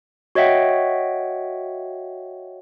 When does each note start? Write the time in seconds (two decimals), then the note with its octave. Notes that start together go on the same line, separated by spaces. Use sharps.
0.35 F#4 C#5 D#5 E5 F#5 G5